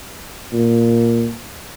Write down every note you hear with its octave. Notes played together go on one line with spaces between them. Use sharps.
A#2